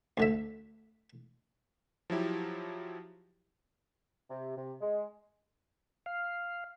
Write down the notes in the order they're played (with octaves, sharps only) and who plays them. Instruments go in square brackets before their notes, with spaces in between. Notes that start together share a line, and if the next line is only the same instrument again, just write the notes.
[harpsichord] D2 D3 E5
[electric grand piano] F3 F#3 E4 G4
[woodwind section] C3
C3
G#3
[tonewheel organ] F5